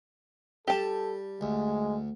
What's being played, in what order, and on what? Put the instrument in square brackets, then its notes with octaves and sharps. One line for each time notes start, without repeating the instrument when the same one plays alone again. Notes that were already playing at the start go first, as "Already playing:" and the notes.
[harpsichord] G3 [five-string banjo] G4 A5 [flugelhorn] A4
[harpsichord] D2 [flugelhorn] G#3